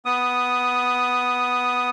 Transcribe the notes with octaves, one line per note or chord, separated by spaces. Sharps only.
B3 D#6